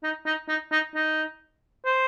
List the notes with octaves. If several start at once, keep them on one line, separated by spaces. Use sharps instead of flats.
D#4
D#4
D#4
D#4
D#4
C5